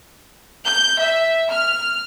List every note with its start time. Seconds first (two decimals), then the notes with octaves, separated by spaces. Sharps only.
0.65 G6
1.01 E5
1.51 F6